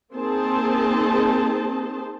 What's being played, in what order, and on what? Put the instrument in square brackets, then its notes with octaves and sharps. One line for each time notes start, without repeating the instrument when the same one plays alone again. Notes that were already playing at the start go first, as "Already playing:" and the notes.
[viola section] A#3 C4 D#4 G#4 C5 A5